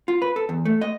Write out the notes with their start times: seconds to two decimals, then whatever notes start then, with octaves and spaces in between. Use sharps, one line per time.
0.08 F4
0.22 B4
0.36 A4
0.49 E2
0.65 A3
0.81 D#5